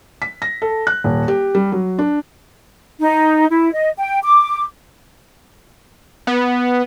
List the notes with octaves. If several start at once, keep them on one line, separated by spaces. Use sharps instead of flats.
B6
A#6
A4
F#6
D#1
G4
G3
F#3
D4
D#4
E4
D#5
G5
D6
B3